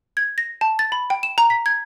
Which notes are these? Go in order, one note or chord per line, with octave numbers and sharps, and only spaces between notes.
G#6
A#6
A5
A6
B5
G5
E7
A#5
B6
G#6